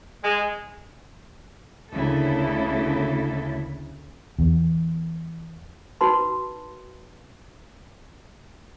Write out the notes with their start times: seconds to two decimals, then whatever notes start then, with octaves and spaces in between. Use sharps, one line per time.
0.23 G#3
1.94 D2 C#3 A#3 E4 A4
4.39 E2
6.01 D#4 F#4 B4 A5 B5 C6